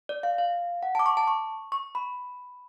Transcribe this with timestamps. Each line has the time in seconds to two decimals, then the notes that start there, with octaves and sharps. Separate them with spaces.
0.09 D5
0.23 F5
0.38 F5
0.83 F#5
0.95 A5 D6
1.06 C#6
1.17 A5
1.27 C#6
1.72 C#6
1.95 B5